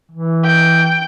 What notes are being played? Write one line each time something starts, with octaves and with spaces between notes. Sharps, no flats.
E3
G5